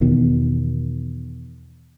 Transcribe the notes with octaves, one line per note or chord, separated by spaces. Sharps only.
E2 B2 D#3